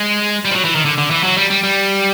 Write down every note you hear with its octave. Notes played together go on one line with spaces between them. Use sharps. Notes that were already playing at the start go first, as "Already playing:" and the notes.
Already playing: G#3
G3
F3
F#3
E3
D#3
D3
D3
E3
F#3
G3
G3
G3